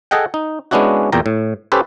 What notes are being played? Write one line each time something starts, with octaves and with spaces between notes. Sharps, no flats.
G#4 A4 D#5 F#5 G5
D#4
G#3 B3 C#4 D4 E4 F#4
E2 A#2 G5 A#5
A2
C#4 G4 A4 B4 C5